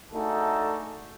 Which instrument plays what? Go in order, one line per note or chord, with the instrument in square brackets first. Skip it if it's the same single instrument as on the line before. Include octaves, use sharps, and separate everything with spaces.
[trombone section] A3 D4 D#4 F#4 G#4 A4